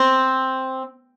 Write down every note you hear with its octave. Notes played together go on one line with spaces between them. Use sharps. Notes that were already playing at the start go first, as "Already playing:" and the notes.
Already playing: C4